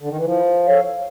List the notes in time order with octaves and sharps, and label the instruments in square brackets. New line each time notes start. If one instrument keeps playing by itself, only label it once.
[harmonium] D3
D#3
E3
[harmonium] F3 [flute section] E4
[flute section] A4 C#5 F5